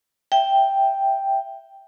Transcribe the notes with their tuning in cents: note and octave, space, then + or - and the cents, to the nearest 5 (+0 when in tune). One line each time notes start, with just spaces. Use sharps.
E5 +0 G5 +0